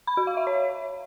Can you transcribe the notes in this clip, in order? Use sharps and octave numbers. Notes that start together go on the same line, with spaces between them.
B5
F#4
F5
E5
C#5